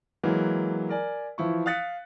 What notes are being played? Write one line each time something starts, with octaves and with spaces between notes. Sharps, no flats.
E3 F#3 G#3 A#3
A#4 D5 G#5
E3 F3 E4 C#6
F5 D#6 F#6 A6 B6 C#7